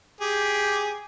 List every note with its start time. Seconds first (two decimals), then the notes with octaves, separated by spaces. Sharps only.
0.21 G4 G#4